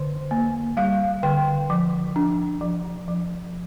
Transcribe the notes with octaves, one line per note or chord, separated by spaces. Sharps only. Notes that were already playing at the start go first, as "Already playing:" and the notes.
Already playing: D3 C5
A#3
G3 F5
D3 G5
F3
D4
F3
F3